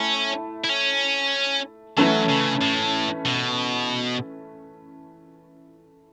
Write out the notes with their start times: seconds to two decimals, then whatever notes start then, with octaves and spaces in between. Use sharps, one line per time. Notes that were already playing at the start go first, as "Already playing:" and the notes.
Already playing: A3 C#4 E4 A4
0.64 E4
0.69 C#4
1.97 E3 F#3 A3 C#4 A4
2.29 C#3
2.62 A2
3.25 B2